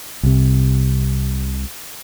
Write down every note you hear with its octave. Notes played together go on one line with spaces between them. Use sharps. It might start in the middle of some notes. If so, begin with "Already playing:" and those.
C2 C3